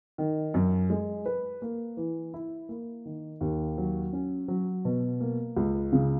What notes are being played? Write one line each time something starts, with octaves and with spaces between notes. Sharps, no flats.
D#3
F#2
G#3
B4
A#3
E3
E4
A#3
D#3
D#2
F#3
C#4
F#3
B2
A#3
C#2
C#3